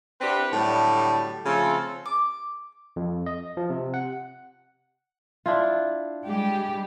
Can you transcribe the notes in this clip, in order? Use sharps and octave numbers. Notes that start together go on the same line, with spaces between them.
C4 D4 E4 G4 B4 F#5
A2 D3 F#3 G3
C#3 F3 A3 C4 F4 A4
D6
F2
D#5
F3
C3
F#5
D4 E4 F4
G3 G#3 G4